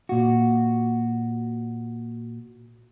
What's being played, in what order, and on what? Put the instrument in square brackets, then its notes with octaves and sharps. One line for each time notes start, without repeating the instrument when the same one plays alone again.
[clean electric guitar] A#2 F#4